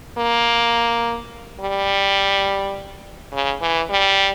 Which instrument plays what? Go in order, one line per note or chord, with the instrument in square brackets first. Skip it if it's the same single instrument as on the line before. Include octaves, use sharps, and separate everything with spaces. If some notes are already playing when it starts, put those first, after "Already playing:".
[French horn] A#3
G3
C#3
E3
G3